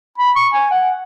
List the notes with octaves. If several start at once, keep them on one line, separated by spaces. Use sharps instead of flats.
B5
C#6
G#5
F#5